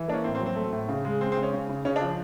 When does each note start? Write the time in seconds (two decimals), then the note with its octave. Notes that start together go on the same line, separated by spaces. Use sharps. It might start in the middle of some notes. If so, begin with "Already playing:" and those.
Already playing: E3
0.08 A#3 D4
0.13 C#4
0.24 A2 C4
0.35 C4
0.40 F#3
0.46 C4
0.56 A3
0.73 A2
0.89 C#3
1.05 G#3
1.21 G#3 C4
1.32 C4
1.37 C#3
1.43 C#4
1.53 C#3
1.69 C#3
1.85 C#3 C#4
1.96 D4
2.01 F3